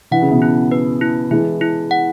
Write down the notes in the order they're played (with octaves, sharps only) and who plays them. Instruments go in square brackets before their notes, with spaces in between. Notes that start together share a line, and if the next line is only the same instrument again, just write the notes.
[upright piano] E3 [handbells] F#5
[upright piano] C#3
B2 E3
[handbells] E4
B4
E4
[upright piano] E3 G#3 [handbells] E4
[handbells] E4
F#5